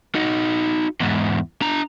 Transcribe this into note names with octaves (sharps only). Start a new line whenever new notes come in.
D#4 F#4
E2 G#2
D4 A#5